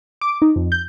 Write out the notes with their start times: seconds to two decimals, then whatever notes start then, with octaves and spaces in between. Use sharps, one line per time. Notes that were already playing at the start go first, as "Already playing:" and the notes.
0.21 D6
0.42 D#4
0.56 F2
0.72 G6